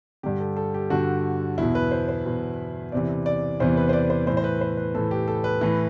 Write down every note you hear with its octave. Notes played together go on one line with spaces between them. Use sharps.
G2 D3 G4
A4
A4
G4
G2 D3 F#4
E2 B2 E4
B4
C5
C5
E2 B2
E2 C3 E3 D5
D5
E2 C3 E3 C5
B4
C5
D5
C5
A2 E3 C5
C5
B4
C5
B4
A2 E3 A4
G4
A4
B4
A2 E3